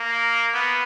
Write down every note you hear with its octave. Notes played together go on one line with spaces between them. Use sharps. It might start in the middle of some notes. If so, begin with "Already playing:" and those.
Already playing: A#3
B3